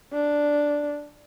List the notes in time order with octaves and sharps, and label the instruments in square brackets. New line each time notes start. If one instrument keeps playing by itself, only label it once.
[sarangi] D4